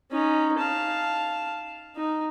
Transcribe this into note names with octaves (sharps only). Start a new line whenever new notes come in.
C#4 D#4
F5 A5
D#4